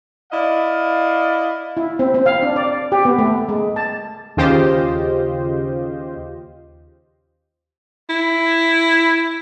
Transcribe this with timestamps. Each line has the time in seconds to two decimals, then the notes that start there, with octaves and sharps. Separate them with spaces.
0.32 E4 D5 D#5 F5
1.77 E4
1.99 C4
2.14 C4
2.26 F5
2.43 D4
2.56 D5
2.92 G4
3.05 B3
3.19 A3
3.49 G#3
3.76 A5
4.37 D#2 C#3 F4 G4 C5 D#5
8.09 E4